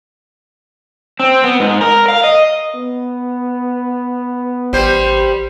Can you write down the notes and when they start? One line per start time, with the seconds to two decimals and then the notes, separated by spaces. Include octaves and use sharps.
1.20 C4
1.44 B3
1.60 G#2
1.81 A#4
2.08 F5
2.24 D#5
2.75 B3
4.73 A1 G3 C5